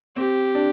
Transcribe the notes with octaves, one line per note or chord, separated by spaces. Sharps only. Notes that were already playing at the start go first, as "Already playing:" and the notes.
C4 G4
D4